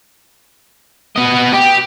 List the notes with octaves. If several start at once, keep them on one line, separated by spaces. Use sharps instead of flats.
B3 D#5
G4